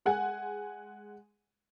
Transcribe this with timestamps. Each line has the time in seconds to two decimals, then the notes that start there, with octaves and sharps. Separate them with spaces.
0.06 G#3 F#5 G#5